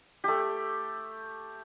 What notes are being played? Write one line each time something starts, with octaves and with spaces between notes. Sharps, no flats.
A3 G4